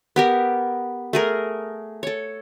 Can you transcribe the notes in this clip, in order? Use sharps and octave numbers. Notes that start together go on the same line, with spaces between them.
B3 G4 A#4
A3 G#4 A#4
A4 C#5